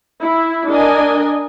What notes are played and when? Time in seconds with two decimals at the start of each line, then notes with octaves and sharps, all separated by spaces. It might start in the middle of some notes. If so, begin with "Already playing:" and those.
0.21 E4
0.70 D4 A#4 D#5 G#5